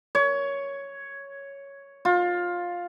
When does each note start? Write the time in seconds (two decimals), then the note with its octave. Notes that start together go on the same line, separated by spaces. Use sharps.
0.15 C#5
2.05 F4